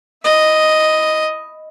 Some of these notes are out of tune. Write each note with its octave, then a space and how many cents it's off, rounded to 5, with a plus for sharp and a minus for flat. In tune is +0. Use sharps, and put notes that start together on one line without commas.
E4 +5 D#5 +0